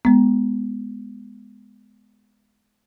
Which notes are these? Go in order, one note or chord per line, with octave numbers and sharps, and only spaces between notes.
G#3 B3